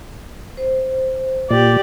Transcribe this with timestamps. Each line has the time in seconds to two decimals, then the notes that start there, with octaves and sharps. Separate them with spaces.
0.57 C5
1.51 A#2 G4 D5